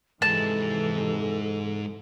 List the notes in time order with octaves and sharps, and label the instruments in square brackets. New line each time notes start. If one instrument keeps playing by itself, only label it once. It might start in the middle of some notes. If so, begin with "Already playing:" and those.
[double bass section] F2 C3 E3 [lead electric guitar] G#2 G#3 [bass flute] A4 [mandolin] A5